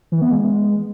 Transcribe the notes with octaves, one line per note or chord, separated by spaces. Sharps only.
E3
B3
G#3